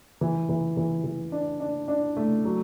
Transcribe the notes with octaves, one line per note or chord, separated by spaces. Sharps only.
E3
E3
E3
E3
D4
D4
D4
A3
F#3